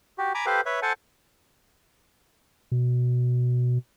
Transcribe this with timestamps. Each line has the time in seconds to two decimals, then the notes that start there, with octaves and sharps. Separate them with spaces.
0.18 F#4 G4
0.35 G#5 A#5 B5 D6
0.46 G4 A4 B4 C5 F5
0.66 B4 C#5 E5
0.82 A4 C5 F#5 G#5 A5
2.72 B2